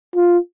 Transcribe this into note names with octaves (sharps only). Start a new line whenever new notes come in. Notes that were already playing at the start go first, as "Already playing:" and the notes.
F4